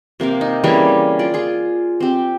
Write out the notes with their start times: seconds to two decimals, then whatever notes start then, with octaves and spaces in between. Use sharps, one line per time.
0.20 C3 A#3 G4 F5
0.41 D#4
0.64 C#3 E3 G3 A#3
1.19 F4 D5
1.34 F4 G#4
2.00 C4 G4